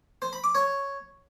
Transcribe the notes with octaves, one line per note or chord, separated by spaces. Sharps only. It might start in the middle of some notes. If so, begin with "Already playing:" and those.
C5
B5
D6
C#5